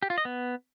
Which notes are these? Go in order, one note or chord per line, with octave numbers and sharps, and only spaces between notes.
G4
F4
D#5
B3